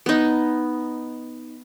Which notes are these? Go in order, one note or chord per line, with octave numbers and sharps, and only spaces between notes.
B3 D#4